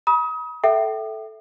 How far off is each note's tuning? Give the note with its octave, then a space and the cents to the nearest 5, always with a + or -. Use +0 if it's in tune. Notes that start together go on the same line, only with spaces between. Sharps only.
B5 -40 D#6 +30
A4 -10 E5 +0 G5 -30